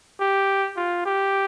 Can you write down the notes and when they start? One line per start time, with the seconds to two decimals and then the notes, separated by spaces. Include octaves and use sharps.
0.20 G4
0.76 F4
1.06 G4